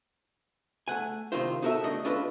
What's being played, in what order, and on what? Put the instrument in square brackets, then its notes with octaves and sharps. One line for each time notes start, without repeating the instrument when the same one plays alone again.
[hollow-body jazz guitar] A3 F#5 G#5
C3 D#3 D#4 F4 C5
D#4 F#4 A4 A#4 E5
D3 A3 D#5
C#4 D4 F4 A4 B4 D#5